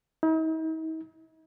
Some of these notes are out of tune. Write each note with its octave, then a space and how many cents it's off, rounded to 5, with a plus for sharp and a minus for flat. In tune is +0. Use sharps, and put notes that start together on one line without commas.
D#4 +45